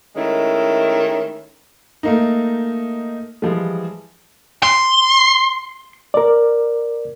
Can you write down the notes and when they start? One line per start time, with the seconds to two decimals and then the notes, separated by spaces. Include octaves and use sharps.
0.15 D#3 G#3 A3 C#4 E4
2.03 A3 A#3 D#4
3.42 E3 F3 G3 G#3
4.63 C6
6.14 A#4 D5